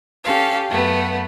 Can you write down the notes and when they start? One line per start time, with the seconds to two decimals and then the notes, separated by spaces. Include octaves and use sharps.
0.24 C#4 G4 A4 F5
0.70 F#2 A3 B3